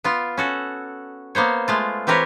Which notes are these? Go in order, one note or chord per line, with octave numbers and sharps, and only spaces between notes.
B3 F4
C#4 F#4 A4
A#3 B3 C5 C#5
G#3 A3 F4
E3 C4 G4 A#4 B4 C#5